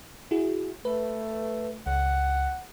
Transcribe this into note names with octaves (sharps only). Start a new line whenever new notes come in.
E4 F#4 G#4
A3 B4
C#2 F#5